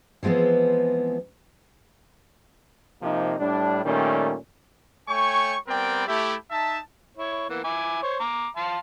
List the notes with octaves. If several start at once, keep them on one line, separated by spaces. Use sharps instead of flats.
E3 F3 G#3 B3 C4
C3 F3 A#3 D#4
A2 G3 D4
A#2 D#3 G3 A3 C#4
A3 C#5 G5 G#5 C#6
G3 B3 C4 A#4 D5 G5
A3 E4 G4
D#4 E5 A5
E4 C#5
E3 A#3 B3
E4 G#5 D6
C5 C#5
A#5 D6
F5 A5 C6